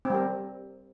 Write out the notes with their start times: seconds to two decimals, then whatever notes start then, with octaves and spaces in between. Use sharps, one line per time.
0.05 C4
0.10 G3
0.15 A#4